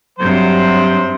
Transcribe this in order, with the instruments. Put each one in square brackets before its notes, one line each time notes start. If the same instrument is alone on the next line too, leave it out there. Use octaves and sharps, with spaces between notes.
[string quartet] G2 C3 [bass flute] F#3 [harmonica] C5